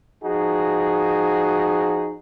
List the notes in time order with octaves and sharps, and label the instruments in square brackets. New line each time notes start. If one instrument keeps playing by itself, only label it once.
[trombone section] F3 D#4 F#4 G#4